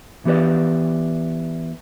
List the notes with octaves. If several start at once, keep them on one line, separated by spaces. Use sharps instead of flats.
E3 B3 G4 B4 D5